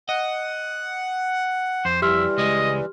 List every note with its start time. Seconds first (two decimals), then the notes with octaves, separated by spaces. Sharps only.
0.09 D#5 F#5
1.85 F2 C5
2.02 E3 G3 G4 E5 C6 F6
2.38 C#2 G#3 D#5